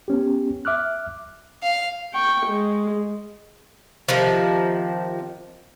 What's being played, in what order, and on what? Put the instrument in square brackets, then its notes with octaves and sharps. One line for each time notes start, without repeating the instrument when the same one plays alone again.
[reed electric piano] B3 C#4 G4
E5 D6 F6 F#6
[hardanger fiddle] F5
[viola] G5 C#6
G#3
[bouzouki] C3 D#3 F3